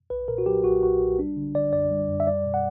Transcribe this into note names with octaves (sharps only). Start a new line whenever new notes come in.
B1 B4
A#2 A#4
F#4
F#3 G4
B1 F#4
B1 F#4
B1
G3 D4
D3
D3 D5
F#2 D5
G3
F#2
E5
G3 D5
B2
F#5